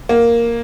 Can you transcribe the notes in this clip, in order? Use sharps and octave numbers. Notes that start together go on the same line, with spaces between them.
A#3